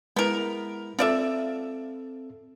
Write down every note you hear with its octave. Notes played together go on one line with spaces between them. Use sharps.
G#3 B3 E4 A#4
C4 F4 A4 D5 E5